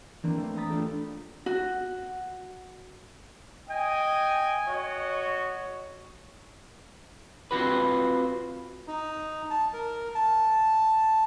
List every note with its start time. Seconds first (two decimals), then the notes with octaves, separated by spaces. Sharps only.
0.23 E3 A#3 C4 D4
0.36 A3 C5
0.56 A#5 B5 D#6 A6 B6
0.69 A3 D4 F4 G4 A4
1.46 F#4
3.70 D#5 G5 G#5
4.67 F#4 C#5 D#5
7.51 C4 F4 F#4 B4
8.88 D#4
9.50 A5
9.73 A#4
10.15 A5